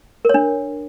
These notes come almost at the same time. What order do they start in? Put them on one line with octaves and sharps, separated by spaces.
A#4 C#5 D4